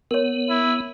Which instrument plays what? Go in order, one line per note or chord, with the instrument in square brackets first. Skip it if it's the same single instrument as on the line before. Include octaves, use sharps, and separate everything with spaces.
[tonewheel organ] B3 [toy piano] A#4 C#5
[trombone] E4